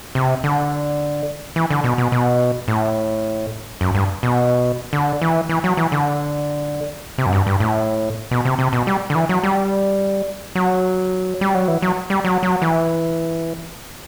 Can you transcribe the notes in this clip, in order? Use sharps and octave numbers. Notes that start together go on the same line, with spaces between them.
C3
D3
E3
D3
B2
B2
B2
A2
F#2
G2
B2
D3
E3
E3
F#3
E3
D3
C3
F#2
G2
G2
A2
B2
C3
C3
B2
G3
D3
E3
F#3
G3
F#3
G3
F#3
E3
F#3
G3
F#3
F#3
E3